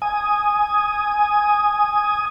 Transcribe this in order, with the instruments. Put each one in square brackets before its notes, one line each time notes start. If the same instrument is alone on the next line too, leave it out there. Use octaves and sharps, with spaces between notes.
[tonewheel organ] G#5 D#6